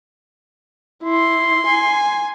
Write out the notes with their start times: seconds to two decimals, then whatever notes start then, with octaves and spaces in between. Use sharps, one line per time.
1.03 E4 C6
1.67 G#5